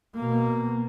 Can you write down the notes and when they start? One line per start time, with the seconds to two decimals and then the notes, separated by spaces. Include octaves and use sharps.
0.15 B2 A#3